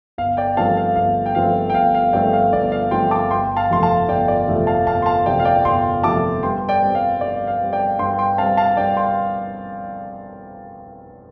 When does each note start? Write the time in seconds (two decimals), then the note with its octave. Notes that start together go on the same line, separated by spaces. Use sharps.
0.18 G1 F5
0.37 D5 G5
0.57 G2 F3 A3 C4 F5 A5
0.77 F5
0.96 G1 F5
1.26 G5
1.35 G2 F3 A3 C4 F5
1.70 G5
1.74 G1 F5
1.94 F5
2.13 G2 F3 A3 C4 D5 G5
2.33 F5
2.53 G1 D5
2.72 F5
2.91 G2 F3 A3 C4 G5 C6
3.11 A5 D6
3.31 G1 G5 C6
3.57 F5 A5
3.70 F2 C3 F3 A3 C6
3.83 F5 A5
4.08 G1 D5 G5
4.28 D5
4.47 F2 C3 F3 A3
4.67 F5 A5
4.86 G1 F5 A5
5.02 C6
5.06 F5 A5
5.25 F2 C3 F3 A3 D5 G5
5.40 F5
5.45 D5 G5
5.65 G1 G5 C6
6.04 F2 C3 F3 A3 A5 D6
6.43 G2 G5 C6
6.69 D5 G5
6.82 G3 C4
6.95 F5
7.21 G2 D5
7.47 F5
7.60 G3 C4
7.73 D5 G5
7.99 G2 G5 C6
8.19 G5 C6
8.38 C4 F5 A5
8.42 G3
8.57 F5 A5
8.77 G2 D5 G5
8.97 G5 C6